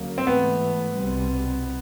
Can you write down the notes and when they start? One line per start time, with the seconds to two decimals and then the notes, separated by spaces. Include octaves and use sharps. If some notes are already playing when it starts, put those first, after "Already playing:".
Already playing: D2 C#3 F#3 A#3
0.18 C4
0.26 G#2 E3 A3 B3
0.96 C2 B2 G3 C4